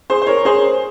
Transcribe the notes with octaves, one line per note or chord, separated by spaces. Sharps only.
G#4 C5
C5
A#4 C#5
G#4 C5